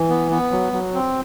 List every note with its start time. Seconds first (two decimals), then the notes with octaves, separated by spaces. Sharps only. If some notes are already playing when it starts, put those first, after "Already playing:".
Already playing: E3
0.10 B3
0.31 B3
0.52 F#3
0.73 F#3
0.94 C4